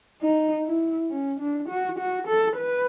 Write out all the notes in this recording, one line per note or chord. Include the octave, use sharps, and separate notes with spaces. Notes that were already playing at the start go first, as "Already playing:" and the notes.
D#4
E4
C#4
D4
F#4
F#4
A4
B4